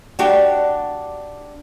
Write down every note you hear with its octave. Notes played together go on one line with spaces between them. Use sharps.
D4 F#4 G4